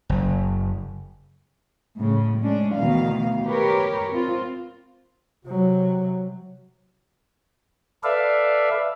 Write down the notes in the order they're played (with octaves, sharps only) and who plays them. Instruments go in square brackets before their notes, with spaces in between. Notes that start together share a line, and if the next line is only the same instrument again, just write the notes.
[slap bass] F#1
[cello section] A2 C#3
G#3 C#4 D4
D2 B2 D#3 E3 F5
G4 A#4 B4 C#5
C4 F4
[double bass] C3 F#3
[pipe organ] A4 B4 D5 E5 F5